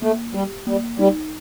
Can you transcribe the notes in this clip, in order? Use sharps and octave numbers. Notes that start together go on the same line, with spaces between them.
A3 A#3
G3 G4
G3 A#3
G3 D#4